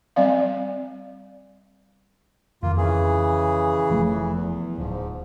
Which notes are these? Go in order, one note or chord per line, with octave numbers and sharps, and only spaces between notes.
G3 C4 D5 F5
F2 D#3 A#3 F4
C#3 E3 G#4
F1 F3 A3
E3
E2
D1 G#2 F3